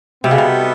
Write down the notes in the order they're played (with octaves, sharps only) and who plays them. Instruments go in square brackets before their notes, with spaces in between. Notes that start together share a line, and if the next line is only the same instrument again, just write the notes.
[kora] C3 [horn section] G3 B3 D#4 F#4 A4
[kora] C#3
C3